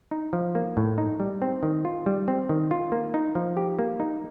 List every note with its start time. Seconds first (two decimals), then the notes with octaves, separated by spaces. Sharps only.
0.11 D#4
0.33 F3
0.55 A#3
0.77 A2
0.98 D#4
1.20 G3
1.42 C4
1.63 D#3
1.85 F4
2.06 G3
2.28 C4
2.49 D#3
2.71 F4
2.92 A#3
3.14 D#4
3.35 F3
3.57 G4
3.79 A#3
4.00 D#4